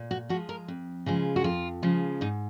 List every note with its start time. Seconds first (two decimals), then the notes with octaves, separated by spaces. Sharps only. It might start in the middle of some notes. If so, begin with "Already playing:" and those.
Already playing: A#2
0.11 F#4
0.29 F3 F#4
0.33 G#3
0.49 A#4
0.68 F2
1.06 C#3 F3 G#3
1.36 F#4
1.44 F2 F4
1.83 C#3 F3 G#3
2.21 G#2 D#4